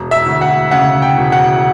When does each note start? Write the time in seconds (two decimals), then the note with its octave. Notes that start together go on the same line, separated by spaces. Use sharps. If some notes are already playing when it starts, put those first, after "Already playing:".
Already playing: E1
0.11 E5
0.26 D2
0.41 F#5
0.71 C#3 F#5
1.02 G5
1.17 E1
1.32 F#5